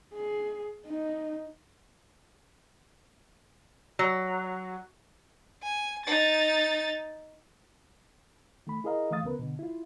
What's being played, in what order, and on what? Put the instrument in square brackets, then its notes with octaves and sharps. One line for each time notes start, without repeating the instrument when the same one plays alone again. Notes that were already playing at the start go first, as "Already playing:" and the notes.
[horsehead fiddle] G#4
D#4
[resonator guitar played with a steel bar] F#3
[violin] G#5
D#4 A6
[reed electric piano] D#3 A3 B5
E4 G#4 A#4 D#5 F5 A#5
D#3 E3 A3 F5 D#6 A6
D2 C#3 B3 A#4 B4
B2 D3
E4 F4